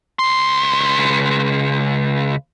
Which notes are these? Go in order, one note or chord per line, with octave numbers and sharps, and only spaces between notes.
C#2 C6